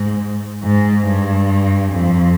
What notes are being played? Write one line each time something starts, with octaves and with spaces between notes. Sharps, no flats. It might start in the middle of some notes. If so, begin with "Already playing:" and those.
Already playing: G#2
G#2
G2
F2